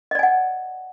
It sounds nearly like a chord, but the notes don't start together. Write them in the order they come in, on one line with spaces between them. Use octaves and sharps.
D#5 D5 G#5 F#5